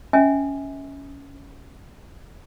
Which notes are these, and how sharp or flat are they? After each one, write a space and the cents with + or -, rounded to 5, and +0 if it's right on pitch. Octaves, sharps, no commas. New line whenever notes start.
C#4 +10 E5 -35 G#5 +0